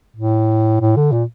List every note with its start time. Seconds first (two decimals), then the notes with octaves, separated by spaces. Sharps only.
0.16 A2
0.81 A2
0.96 D3
1.12 A#2